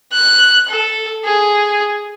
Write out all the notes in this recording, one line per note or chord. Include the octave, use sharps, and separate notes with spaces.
F#6
A4
G#4